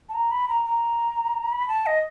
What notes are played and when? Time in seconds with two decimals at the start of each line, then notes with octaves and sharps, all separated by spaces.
0.09 A5
0.14 A#5
0.31 B5
0.48 A#5
0.65 A#5
1.52 B5
1.68 A5
1.86 D#5